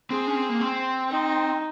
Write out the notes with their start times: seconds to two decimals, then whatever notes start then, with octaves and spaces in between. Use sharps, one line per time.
0.10 C4 G#4
0.27 C#4
0.35 C4
0.49 A#3
0.61 C4
1.11 D#4